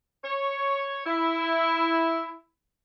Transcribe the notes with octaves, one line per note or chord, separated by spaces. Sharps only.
C#5
E4